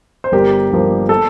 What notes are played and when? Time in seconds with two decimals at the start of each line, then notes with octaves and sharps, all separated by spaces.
0.24 C5
0.32 G1 G4 A#4
0.70 G2 F3 A#3
1.09 A4